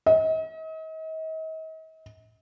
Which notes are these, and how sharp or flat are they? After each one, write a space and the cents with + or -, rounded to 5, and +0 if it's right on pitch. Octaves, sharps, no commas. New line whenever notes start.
D#5 +40